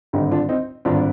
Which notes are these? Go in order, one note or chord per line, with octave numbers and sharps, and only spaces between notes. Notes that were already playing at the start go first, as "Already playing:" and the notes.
G#1 G2 D3 D#4 G4
D4 F4
C4 D#4
G#1 G2 D3 D4 F4